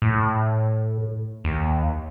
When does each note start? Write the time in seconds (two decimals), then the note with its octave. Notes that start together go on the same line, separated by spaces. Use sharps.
0.02 A2
1.44 D#2